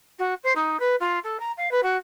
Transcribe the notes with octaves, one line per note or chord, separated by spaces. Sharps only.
F#4
C5
D#4
B4
F4
A4
A#5
F5
B4
F#4